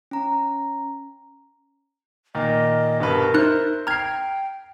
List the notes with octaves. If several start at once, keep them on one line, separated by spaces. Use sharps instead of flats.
C#4 A#5
A#2 D#3 A#3 D#5
G2 B2 A#4 B4
D#4 C5 E5 F#6
G5 A#5 F6 G#6 C7